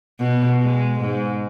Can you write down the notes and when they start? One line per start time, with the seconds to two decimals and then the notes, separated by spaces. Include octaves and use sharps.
0.19 B2
0.62 G#3
1.01 G#2